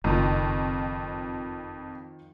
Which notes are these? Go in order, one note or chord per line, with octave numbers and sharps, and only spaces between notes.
F#1 F2 D#3 F3